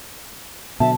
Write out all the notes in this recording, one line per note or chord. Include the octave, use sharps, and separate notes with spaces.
B2 D3 F#3 E5 A5